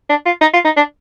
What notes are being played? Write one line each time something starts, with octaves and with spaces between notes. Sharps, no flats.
D4
F4
D#4
F4
D#4
D4